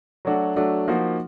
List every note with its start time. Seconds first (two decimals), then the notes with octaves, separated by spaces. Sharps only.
0.25 F#3 A3 D4 F#4
0.56 F#3 A3 D4 F#4
0.88 F3 A#3 D#4 F#4